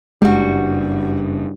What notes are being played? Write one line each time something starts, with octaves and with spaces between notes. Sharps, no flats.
F#1 G2 G3 G#3 F#4